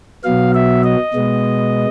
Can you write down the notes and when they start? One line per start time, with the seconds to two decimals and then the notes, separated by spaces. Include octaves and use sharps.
0.24 B2 F#3 B3 F5
0.54 E5
0.84 D#5
1.14 B2 G#3 B3